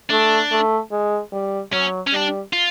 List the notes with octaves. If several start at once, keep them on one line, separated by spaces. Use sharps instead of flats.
A3 D4
A3
G#3
G3
F#3 C#4
C#4
G3 D4
F4